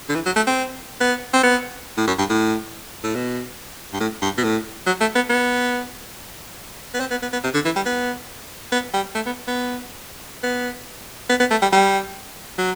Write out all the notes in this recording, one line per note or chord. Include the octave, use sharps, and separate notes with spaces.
D3
E3
F#3
A3
C4
B3
C4
B3
A2
F#2
G2
A2
A2
B2
G2
A2
G2
B2
A2
F#3
A3
B3
B3
B3
C4
B3
B3
B3
C3
D3
E3
G3
B3
B3
G3
A3
B3
B3
B3
B3
B3
A3
G3
G3
F#3